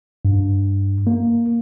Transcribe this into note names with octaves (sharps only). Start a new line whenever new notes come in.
G2
A#3